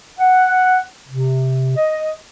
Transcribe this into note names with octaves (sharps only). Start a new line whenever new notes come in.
F#5
C3
D#5